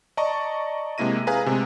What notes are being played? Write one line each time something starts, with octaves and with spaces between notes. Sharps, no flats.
D5 D#5 A5 A#5 C#6
C3 G#3 A#3 E4 A#6 D#7
G#4 B4 F5 G#5 A#5
C3 G#3 A3